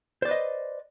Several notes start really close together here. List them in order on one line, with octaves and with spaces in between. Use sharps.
C5 D5 B4 D#5